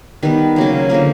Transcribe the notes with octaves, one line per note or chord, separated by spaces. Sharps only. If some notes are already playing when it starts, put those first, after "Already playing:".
D#3 G3 B3 B4
C#3 F#3 A#3
D3 F3 A#3 A#4